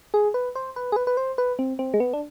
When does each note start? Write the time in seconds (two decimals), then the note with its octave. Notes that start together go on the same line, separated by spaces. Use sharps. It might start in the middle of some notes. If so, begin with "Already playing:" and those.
0.14 G#4
0.34 B4
0.55 C5
0.76 B4
0.92 G#4
0.96 B4
1.07 B4
1.17 C5
1.38 B4
1.59 C4
1.79 C4
1.94 G#3
2.00 B3
2.13 D4